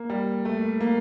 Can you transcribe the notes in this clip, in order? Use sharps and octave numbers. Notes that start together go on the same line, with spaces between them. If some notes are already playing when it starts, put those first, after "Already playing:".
Already playing: A#3
G3
A3
A#3